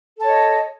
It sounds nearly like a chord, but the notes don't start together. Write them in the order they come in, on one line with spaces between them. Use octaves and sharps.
A4 A5 C#5 D#5